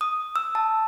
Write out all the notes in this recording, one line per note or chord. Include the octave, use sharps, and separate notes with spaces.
D#6
E6
A5